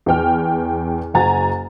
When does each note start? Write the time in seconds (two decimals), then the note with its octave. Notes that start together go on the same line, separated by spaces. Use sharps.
0.06 E2 B4 G5 F6
1.14 F#1 F#4 G#5 A#5 A6